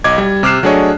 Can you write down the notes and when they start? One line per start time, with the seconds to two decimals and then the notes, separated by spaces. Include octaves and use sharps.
0.04 B1 D#5 D6 G#6
0.18 G3
0.43 C3 D6 F6 F#6 C7 E7
0.63 F#3 A3 D4 G#4 C#5 D#5